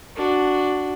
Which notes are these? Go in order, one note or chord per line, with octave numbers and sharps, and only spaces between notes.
D4 F#4